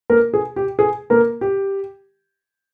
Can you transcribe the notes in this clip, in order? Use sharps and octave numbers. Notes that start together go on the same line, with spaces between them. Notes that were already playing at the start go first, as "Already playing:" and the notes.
A#3 A#4
G#4
G4
G#4
A#3 A#4
G4